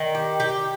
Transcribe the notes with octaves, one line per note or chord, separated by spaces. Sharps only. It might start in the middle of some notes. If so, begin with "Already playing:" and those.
Already playing: D#3
G4
G4